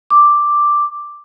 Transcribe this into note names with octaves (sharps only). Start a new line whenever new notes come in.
D6